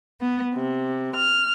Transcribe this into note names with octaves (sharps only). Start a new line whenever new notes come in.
B3
C3
F6